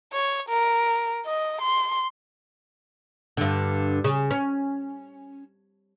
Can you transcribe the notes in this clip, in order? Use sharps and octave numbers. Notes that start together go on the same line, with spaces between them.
C#5
A#4
D#5
C6
G2 D3
C#3
C#4